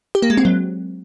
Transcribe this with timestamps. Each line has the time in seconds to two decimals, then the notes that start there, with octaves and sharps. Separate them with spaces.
0.15 G4
0.22 A#3
0.30 G#3
0.37 C4
0.45 F#3